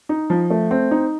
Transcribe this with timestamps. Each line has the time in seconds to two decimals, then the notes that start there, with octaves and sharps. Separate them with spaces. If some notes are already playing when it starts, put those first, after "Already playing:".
0.09 D#4
0.30 F3
0.50 A3
0.71 C4
0.91 D#4